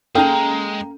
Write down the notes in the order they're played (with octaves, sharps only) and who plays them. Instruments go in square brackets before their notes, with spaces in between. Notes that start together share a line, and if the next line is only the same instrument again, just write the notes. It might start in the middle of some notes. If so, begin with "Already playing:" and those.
[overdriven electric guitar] G#3 [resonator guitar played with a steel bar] A#3 A#5 [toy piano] C#4 A4 [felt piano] G5